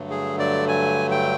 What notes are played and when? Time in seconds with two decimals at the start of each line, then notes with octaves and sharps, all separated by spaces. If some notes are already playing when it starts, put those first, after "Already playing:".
Already playing: G2 D3 F#3 A3
0.10 G#4
0.39 D5
0.68 G#5
1.11 G5